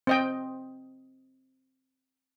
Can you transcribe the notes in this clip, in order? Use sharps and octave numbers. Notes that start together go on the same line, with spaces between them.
C4 D#5 G5